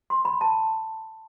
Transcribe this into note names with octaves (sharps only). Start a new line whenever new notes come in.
C6
B5
A5